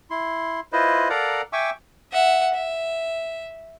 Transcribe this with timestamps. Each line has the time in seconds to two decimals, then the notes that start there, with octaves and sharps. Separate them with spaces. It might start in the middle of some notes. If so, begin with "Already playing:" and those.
0.11 E4 C6
0.73 E4 F4 B4 C5 D#5
1.10 A4 A#4 D5 F5 F#5 A#5
1.53 E5 G5 G#5 C#6 D6 E6
2.12 E5 F#5
2.54 E5